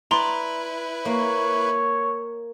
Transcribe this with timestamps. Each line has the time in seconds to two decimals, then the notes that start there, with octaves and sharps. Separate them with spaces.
0.11 E4 B4 D5 A#5 C6
1.05 A#3 C#5